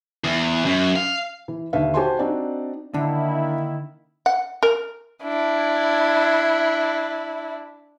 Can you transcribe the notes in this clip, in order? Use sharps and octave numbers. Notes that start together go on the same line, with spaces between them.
E2
F#2
F5
E3
D#2 D3 B4 E5 F5
F#4 G4 C5 G#5 A5 C6
C4 D4 D#4 F#4 D5
D3 D#3 A#3 D4 E4
F#5
A#4
D4 E4